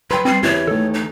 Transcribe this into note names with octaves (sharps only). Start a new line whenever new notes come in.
F#3 B4 G5 B5 C6
G3 C4 C7
E2 E4 G4 C#5
D#3 A3 A4
D#4